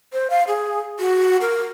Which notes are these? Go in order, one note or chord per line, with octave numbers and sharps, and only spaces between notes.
C5
F5
G#4
F#4
A#4